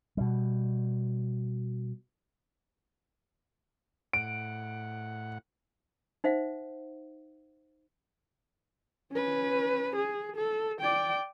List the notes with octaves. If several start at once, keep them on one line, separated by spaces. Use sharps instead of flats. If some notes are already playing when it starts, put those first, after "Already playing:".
B2 G3
A2 F#5 D7
D#4 C5 E5 F#5
C#4 B4
G#4
A4
D5 G5